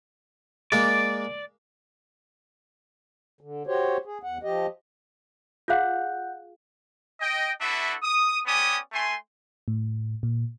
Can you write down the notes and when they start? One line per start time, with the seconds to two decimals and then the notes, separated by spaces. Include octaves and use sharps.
0.72 G#3 A#3 D5
3.41 D3
3.67 F#4 G4 C5 C#5
4.06 G#4
4.23 E2 F#5
4.43 F3 G4 D#5
5.68 F4 G#4 F5 F#5 F#6 G6
7.21 D#5 G5
7.61 D4 E4 F#4 A4 B4 E5
8.03 D#6
8.46 B3 C#4 G4 D5 G#5 D#6
8.93 A3 G#5 C6
9.68 A2
10.23 A#2